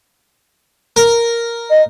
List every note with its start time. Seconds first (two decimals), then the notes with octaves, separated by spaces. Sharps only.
0.96 A#4
1.70 D#5